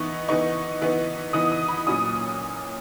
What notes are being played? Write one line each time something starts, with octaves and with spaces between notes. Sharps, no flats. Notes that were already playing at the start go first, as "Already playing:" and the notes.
Already playing: E3 B3 D#4 C#6
E3 B3 D#4 C#6
E3 B3 D#4
E3 B3 D#4 D#6
D#6
B5
A#2 F#3 C#4 D#6